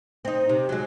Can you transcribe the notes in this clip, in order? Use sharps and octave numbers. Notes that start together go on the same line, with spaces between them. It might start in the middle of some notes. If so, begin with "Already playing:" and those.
C4 D#4
C3
F#3 G#3